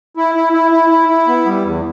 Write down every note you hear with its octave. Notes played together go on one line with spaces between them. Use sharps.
E4
E4
E4
E4
E4
E4
B3
G3
E2